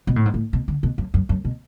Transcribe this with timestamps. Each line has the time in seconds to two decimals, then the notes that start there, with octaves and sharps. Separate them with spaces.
0.07 B2
0.16 A2
0.26 G#2
0.34 A2
0.53 B2
0.68 D3
0.83 B2
0.98 F#2
1.14 F#2
1.29 F#2
1.45 B2